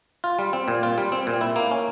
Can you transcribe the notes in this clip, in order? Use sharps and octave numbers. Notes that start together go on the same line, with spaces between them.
F4
G3
C4
A#2
F4
G3
C4
A#2
E4
A#3
C#4